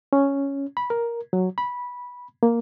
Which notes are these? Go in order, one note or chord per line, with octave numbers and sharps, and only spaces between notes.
C#4
B5
A#4
F#3
B5
A#3